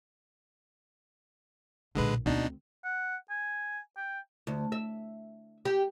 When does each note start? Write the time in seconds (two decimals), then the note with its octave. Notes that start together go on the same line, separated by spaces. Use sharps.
1.95 B1 A#2 D3 G#3 B4
2.26 D2 B2 C4 D4 D#4
2.84 F#5
3.30 G#5
3.97 G5
4.47 D2
4.72 E5
5.65 G4